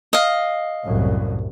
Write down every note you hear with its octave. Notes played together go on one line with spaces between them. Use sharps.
D#5 F5
C2 F#2 A2